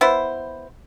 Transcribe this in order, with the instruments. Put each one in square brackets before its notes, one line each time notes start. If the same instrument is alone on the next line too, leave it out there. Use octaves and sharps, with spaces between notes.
[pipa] B3 E4 C5